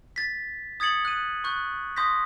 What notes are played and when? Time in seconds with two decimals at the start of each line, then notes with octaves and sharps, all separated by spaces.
0.16 A6 B6
0.80 D#6 G#6 A6 C#7 F#7
1.05 F#6 D#7
1.44 C#6 F#6 G6
1.96 C6 D#6 G6 A#6 B6